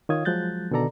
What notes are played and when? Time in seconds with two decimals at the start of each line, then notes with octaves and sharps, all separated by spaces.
0.09 D#3 F4 C#5 F5 D#6 G#6
0.25 F3 F#3 G#3 F#6 G6 A6
0.71 B2 D3 D#3 A4 D5 A#5